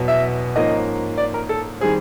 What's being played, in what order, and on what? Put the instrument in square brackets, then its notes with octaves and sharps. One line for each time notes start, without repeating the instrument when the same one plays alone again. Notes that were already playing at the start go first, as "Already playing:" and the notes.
Already playing: [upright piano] E2 B2 F#3 B3
E5
G#2 F3 A#3 C#4 D#5
D5
A#4
A4
D#3 G3 C4 G#4